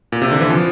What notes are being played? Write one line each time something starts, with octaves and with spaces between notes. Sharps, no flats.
A#2
C3
D3
E3
F3